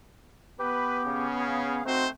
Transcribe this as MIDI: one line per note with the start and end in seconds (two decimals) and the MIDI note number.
0.59 1.81 59
0.59 1.27 67
0.59 1.00 71
1.05 1.80 49
1.05 1.80 61
1.39 1.84 68
1.39 1.84 77
1.85 2.11 57
1.85 2.08 60
1.85 2.06 63
1.85 2.06 66
1.85 2.06 72